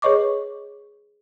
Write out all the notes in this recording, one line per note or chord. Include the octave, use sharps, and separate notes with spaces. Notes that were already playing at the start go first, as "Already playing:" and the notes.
G#4 B4 C#5 D#5 C#6 D6